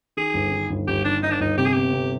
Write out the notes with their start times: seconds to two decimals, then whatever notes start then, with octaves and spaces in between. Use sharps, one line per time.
0.17 D#3 G#4
0.34 G1
0.52 D#3
0.70 G1
0.87 G1 G4
1.05 D#3 D4
1.23 D#3 D#4
1.31 D4
1.40 G1 D#4
1.57 C3 G4
1.66 G#4
1.73 B3 G4
1.93 C3